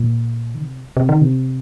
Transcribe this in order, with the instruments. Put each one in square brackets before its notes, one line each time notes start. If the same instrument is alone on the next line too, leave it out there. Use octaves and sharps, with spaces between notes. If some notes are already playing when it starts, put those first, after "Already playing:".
Already playing: [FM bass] A#2
D#3
C3
C3
D#3
C3